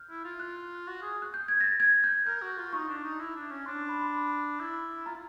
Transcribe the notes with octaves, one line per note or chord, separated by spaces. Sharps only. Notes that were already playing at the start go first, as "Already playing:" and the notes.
Already playing: F6 G6
E4
F4
F#6
F#4
G#4
F#6
G6
G#6
A#6
A6
G#6
G6
A#4 G6
F#4
F4
D#4 C#6
D4
D#4
E4
D4
C#4
D4 C6
B5
C6
B5
E4
F4 A#5